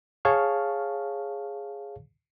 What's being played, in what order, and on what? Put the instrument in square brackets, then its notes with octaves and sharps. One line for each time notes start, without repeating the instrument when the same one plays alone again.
[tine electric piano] G#4 C#5 F5 A5 C#6 F6